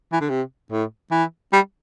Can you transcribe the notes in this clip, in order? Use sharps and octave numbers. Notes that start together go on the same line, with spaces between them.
E3
D3
C3
A2
E3
G3